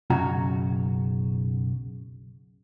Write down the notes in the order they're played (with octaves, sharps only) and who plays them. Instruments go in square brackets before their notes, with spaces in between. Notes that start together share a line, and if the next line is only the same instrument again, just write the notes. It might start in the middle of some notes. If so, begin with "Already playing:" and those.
[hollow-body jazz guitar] B1 F#2 C#3 F#4 A#5